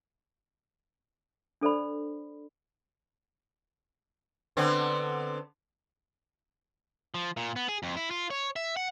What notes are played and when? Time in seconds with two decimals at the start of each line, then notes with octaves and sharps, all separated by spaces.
1.61 D4 A4 C5 D5 B5
4.57 D3 B3 C4
7.14 F3
7.37 A#2
7.56 B3
7.69 G#4
7.83 F2
7.96 E4
8.11 F4
8.30 C#5
8.56 E5
8.77 F#5